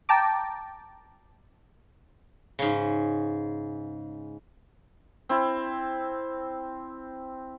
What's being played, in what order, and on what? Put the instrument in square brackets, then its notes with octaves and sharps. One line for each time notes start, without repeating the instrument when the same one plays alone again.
[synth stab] G5 A5 A#5 D6
[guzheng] G#2 C#3
[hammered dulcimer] C4 E4